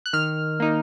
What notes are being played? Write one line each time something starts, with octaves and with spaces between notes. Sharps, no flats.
F#6
D#3 F6
A#3 D#4